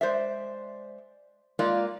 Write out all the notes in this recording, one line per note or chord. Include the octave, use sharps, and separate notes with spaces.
G#3 C5 D5 E5
G#3 A#3 F4 D5